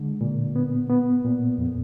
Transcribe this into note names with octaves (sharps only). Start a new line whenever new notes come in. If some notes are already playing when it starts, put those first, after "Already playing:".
Already playing: D3 G#3
A#2
B3
B3
A#2
F2